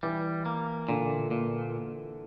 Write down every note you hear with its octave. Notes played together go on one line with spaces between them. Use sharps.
E3 G3
A#3
A#2 D3
A#2